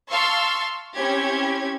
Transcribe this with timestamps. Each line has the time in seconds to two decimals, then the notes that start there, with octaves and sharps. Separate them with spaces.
0.10 F5 A5 C6 C#6 E6
0.94 C4 C#4 E4 G4 G#6